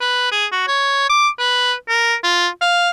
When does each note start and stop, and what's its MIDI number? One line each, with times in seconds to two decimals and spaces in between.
0.01 0.29 71
0.32 0.46 68
0.52 0.63 66
0.67 1.08 73
1.09 1.28 86
1.39 1.74 71
1.89 2.15 70
2.24 2.47 65
2.61 2.90 77